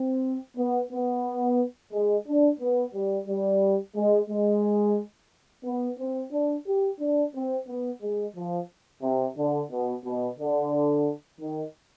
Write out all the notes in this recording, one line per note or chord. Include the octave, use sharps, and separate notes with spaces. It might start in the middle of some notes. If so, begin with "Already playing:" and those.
Already playing: C4
B3
B3
G#3
D4
B3
G3
G3
G#3
G#3
B3
C4
D4
G4
D4
C4
B3
G#3
F3
C3
D3
B2
B2
D3
D#3